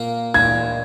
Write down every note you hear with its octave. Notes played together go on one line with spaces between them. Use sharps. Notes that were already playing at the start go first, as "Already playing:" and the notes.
Already playing: A#2 A#3
A#2 G#6